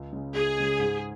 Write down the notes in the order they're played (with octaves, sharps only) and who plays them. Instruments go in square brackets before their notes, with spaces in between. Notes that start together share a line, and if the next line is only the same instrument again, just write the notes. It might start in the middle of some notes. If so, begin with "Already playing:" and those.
Already playing: [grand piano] C#2
C#3 G#3
[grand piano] C#2 [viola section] G#4
[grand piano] C#3 G#3
G#2